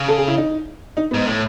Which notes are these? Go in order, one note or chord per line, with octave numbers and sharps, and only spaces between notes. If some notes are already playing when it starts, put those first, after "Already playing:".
Already playing: C#3
A4
G#4
E4
D#4
D#4
G#2 B3
A2